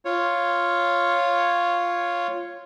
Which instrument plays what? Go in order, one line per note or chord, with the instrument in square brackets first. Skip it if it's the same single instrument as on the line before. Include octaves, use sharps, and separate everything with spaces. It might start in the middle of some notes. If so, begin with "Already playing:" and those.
[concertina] F4 C#5